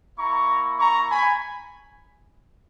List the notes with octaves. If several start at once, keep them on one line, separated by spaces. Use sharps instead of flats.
A#3 E4 A#5 C#6
A#5 C#6
G#5 B5